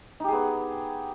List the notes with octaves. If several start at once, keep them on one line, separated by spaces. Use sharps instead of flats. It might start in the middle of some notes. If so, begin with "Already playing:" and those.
B3 D#4 G4 G#4